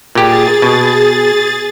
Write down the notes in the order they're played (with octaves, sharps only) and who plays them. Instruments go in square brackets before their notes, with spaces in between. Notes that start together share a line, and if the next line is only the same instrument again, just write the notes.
[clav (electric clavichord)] A#2 G4 [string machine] G#4 A6
[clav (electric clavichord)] B2